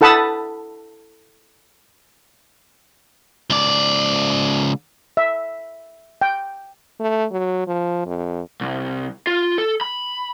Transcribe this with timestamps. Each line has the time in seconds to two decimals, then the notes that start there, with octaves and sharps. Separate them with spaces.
0.01 E4 A4 F#5 A5 B5 D#6
3.50 C#2 D5
5.17 E5
6.22 G5
7.00 A3
7.32 F#3
7.67 F3
8.06 F2
8.61 C2
9.27 F4
9.58 A4
9.81 B5